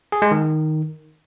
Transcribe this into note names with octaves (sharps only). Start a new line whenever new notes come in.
G#4
G#3
D#3